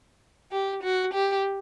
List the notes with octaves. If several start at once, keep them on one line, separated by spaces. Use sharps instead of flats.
G4
F#4
G4